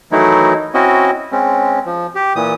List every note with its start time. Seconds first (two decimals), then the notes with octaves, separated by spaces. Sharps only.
0.12 D#3 E3 F#3 A3 D#4 E4
0.74 C4 C#4 E4 F#4 D#5
1.32 G#3 C4 C#4
1.86 F3
2.15 G4
2.36 A#2 E3 D#6